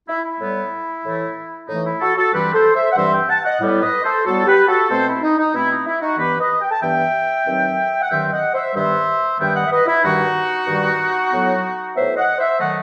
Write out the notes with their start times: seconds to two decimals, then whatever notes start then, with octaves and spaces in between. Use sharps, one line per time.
0.08 E4
0.24 E4
0.40 A2 G3 B3
1.04 A2 E3 A3
1.68 A2 E3 A3 D#4
1.84 E4
2.01 F#4 A4
2.17 F#4 A4
2.32 G2 E3 G3 C4 G4 B4
2.54 A4 C5
2.75 C5 E5
2.92 F#5
2.96 G2 E3 G3 C4 C5 E5
3.12 E5 G5
3.29 F#5 A5
3.45 D#5 F#5
3.61 A2 G3 B3
3.83 B4 D#5
4.04 A4 C5
4.25 A2 G3 B3 F#4 A4
4.46 G4 B4
4.68 F#4 A4
4.89 B2 A3 C4 A4 C5
5.06 E4
5.22 D#4
5.37 D#4
5.53 B2 A3 C4 E4
5.70 D#4
5.86 E4
6.01 D#4 F#4
6.18 G2 E3 B3 G4 B4
6.39 B4 D#5
6.61 G5
6.71 A5
6.81 G2 E3 B3 E5 G5
7.46 G2 D#3 F#3 C4
8.02 F#5
8.10 G2 D#3 F#3 C4 E5 G5
8.27 E5
8.32 D#5 F#5
8.54 C5 E5
8.75 G2 D#3 G3 B3 C5 E5
9.39 G2 D#3 G3 B3 E5 G5
9.55 D#5 F#5
9.65 E5
9.71 B4 D#5
9.87 E4
10.04 G2 D#3 G3 D#4 F#4
10.67 G2 D#3 G3
11.32 A2 F#3 B3
11.96 A2 F#3 B3 C5 E5
12.17 D#5 F#5
12.38 C5 E5
12.60 D#3 F#3 A3 D#5 F#5